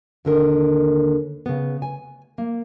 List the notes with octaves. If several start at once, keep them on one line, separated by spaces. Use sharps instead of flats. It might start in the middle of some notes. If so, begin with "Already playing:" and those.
D#2 D3 A#4
C#3 B3
G#5
A#3